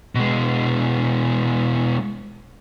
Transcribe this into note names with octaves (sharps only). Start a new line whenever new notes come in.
B2 G#3